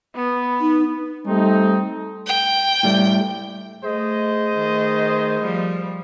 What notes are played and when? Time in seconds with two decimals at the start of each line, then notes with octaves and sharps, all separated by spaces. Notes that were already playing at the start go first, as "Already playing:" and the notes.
0.15 B3
0.61 D#4
1.26 G3 A3 C4 D#4
2.27 G5
2.83 A2 G3 A3
3.84 A3 G#4 C5 D#5
4.53 D#3 A3
5.41 F3 G3